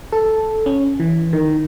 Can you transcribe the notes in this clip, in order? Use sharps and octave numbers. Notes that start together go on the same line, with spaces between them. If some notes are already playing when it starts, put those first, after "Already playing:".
A4
C#4
E3
D#3